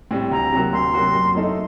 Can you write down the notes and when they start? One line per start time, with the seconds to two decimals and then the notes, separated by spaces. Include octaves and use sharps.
0.11 A2 G3 C4
0.32 D2 A#5
0.53 C3 F#3 A#3 F#4
0.73 D2 C6
0.94 C3 F#3 A#3 F#4
1.14 F#2
1.35 F#3 A3 D#4 A4